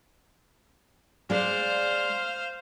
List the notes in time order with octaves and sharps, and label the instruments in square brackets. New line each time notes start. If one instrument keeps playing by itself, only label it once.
[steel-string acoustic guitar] G#3 D5 [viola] C5 F5